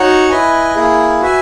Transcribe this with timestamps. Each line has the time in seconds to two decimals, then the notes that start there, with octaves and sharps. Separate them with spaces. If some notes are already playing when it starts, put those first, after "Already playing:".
Already playing: D#4 F#4 C#5 F#5
0.29 E4 B4 D#5 G#5
0.75 A#3 E4 G#4
1.21 F#4 B4 E5 G#5